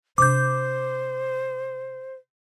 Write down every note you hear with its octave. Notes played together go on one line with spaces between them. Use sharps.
C3 D4 C5 D6 G6